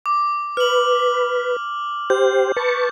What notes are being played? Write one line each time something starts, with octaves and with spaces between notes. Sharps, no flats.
D6
B4 F6 F#7
G4 C5 G6
B4 A5 C#6